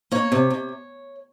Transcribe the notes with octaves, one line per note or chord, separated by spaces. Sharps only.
A#3 C#5
C3
C3